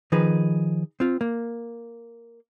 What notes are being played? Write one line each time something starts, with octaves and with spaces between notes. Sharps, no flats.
D#3 F3 D#4 G#4 B4
C4 F4
A#3